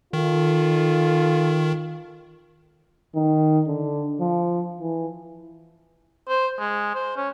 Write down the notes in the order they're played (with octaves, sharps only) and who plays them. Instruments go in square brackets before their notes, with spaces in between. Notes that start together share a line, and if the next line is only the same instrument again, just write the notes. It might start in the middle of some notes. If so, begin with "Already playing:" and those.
[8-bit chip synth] D#3 [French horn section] D#4 F4 A4
[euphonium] D#3
D3
F3
E3
[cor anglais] C5
G#3
C5
C#4